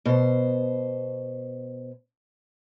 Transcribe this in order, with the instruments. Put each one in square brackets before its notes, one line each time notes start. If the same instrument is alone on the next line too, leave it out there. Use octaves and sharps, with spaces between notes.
[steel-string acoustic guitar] B2 C5